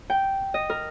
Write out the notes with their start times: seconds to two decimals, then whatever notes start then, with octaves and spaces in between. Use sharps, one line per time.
0.10 G5
0.54 D#5
0.70 A#4